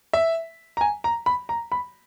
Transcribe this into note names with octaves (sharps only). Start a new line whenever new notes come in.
E5
A#5
G#5
A#5
B5
A#5
B5